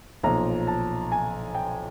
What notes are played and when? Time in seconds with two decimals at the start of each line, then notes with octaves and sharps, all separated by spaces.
0.23 B1 A#2 F3 A#5
0.67 A5
1.12 G#5
1.55 G5